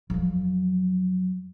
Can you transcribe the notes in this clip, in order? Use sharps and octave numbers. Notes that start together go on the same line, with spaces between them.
F2 F#3